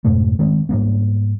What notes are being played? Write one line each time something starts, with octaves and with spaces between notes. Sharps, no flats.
F2 G#2 B2 A3
D#3 G#3 A#3 C4
G#2 G3 A#3 B3